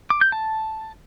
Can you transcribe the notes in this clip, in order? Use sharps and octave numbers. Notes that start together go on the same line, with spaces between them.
D6
G6
A5